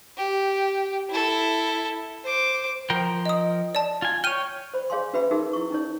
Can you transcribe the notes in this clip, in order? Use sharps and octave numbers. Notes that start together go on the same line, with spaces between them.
G4
E4 A4
C5 D6
F3 A#4 G5
D#5 D#6
D5 A5
F4 G#5
C#5 G5 F6 D#7
C5 B5
G#4 C#5 F5 G#5 C6
C#4 F#4 B4 E5 G5 B5
D#4 F#4 G#4 A#4 E5
E4 C#6
C#4 D#4 C#5